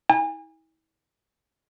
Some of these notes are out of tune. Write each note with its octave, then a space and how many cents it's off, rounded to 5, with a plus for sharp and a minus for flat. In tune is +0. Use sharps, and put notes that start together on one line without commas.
E4 -40 G#5 -35